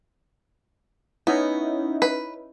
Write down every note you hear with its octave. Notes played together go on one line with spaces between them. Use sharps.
B3 C#4 D#4 E4
B4